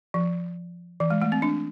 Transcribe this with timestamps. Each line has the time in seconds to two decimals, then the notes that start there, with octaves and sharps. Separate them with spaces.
0.14 F3
1.00 E3
1.10 G#3
1.22 A3
1.32 C4
1.42 D4